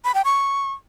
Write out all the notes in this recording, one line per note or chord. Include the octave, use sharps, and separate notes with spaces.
B5
G5
C#6